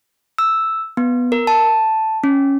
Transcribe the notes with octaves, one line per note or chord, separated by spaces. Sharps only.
E6
B3
A#4
A5
C#4